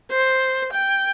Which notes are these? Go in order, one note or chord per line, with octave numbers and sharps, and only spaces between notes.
C5
G5